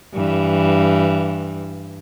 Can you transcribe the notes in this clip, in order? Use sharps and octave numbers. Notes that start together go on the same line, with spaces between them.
G2 E3